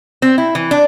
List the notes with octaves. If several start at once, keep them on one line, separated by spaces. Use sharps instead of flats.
C4
E4
E3
D4